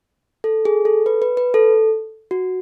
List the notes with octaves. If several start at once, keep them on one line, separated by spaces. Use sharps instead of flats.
A4
G#4
A4
B4
B4
B4
A4
F#4